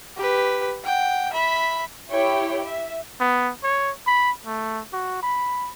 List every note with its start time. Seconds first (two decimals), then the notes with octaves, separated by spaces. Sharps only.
0.17 G4 B4
0.84 F#5 G5
1.33 E5 B5
2.10 E4 G4 C#5 G5
2.64 E5
3.20 B3
3.63 C#5
4.07 B5
4.45 A3
4.93 F#4
5.23 B5